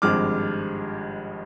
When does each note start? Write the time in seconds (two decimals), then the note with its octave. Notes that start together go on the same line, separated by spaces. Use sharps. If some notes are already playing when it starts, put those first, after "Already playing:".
0.02 G#1 G2 F3 G#3 D6 F6